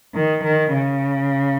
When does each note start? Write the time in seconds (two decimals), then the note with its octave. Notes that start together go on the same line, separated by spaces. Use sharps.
0.14 D#3
0.44 D#3
0.73 C#3